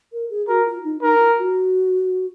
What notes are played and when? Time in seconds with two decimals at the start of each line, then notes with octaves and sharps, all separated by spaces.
0.13 A#4
0.30 G#4
0.48 F#4 A#4
0.66 F4
0.84 D#4
1.02 D#4 A#4
1.19 F4
1.37 F#4